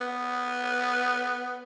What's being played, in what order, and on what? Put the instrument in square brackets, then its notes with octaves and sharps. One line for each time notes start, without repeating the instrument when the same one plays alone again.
[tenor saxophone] B3